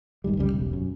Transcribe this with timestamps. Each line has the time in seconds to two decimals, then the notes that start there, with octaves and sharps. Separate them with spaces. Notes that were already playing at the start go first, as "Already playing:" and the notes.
0.24 G#1 G#2 D#3 G3
0.37 C#2 F#2 C#3 G3
0.52 E1 B1
0.73 F#2